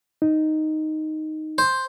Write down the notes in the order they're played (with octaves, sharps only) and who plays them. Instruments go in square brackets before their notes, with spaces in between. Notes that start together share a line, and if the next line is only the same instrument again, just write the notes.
[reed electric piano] D#4
[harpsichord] C5